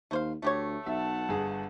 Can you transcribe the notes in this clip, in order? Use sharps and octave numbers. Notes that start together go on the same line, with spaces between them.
D#2 A3 C5 F5
D2 A3 G4 C#5
B1 E5 F#5 A5
G1 G#4